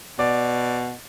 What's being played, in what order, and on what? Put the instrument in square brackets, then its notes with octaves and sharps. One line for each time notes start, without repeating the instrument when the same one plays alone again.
[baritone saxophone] B2 [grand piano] D5